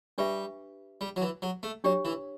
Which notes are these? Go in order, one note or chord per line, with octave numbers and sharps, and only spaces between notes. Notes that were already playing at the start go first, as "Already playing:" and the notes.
G3 D4 G4 B4 E5
G3
F#3
E3
F#3
A3
F#3 D4 G4 C#5
E3